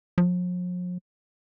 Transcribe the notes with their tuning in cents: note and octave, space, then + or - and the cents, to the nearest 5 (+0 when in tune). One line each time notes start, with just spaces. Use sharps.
F3 +45